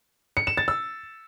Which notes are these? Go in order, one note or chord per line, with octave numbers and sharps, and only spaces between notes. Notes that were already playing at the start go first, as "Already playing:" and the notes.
C#7
E7
A6
E6